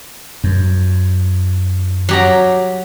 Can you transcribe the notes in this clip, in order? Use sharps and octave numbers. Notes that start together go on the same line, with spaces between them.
F#2
F#3 G4 A#5